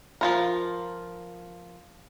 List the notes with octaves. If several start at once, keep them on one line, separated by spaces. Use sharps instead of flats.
F3 F4 A#4